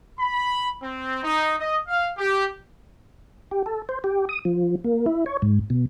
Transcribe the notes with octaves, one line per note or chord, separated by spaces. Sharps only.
B5
C4
D#4
D#5
F5
G4
G4
A4
C5
G4
D#6
F3
A#3
E4
C#5
G#2
B2